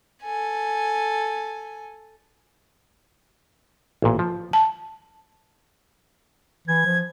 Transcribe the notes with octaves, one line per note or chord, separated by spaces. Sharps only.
A4 G#5
A1 A#2
F3
A5
E3 G#6
F3